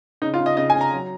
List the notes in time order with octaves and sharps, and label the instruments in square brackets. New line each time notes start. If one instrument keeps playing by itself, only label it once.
[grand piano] C#3 D#4
F4
C#3
D#5
C#3 D#5
G#5
C#3
A#5
F#3